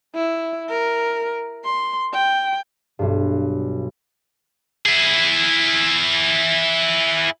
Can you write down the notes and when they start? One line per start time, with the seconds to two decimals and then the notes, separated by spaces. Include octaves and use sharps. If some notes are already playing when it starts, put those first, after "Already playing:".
0.15 E4
0.70 A#4
1.64 C6
2.14 G5
2.99 B1 G2
4.86 E4 G#4